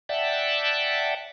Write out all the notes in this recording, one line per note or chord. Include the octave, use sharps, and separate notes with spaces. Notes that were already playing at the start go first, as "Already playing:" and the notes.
D5 E5 F#5 G5 A5